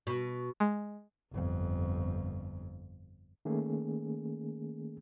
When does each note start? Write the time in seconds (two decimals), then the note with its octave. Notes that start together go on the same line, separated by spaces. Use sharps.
0.07 B2
0.60 G#3
1.33 G1 F2
3.45 D#3 A3 A#3 C#4 G#4